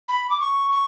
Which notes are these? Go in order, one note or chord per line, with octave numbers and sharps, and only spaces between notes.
B5
D6
C#6
C#6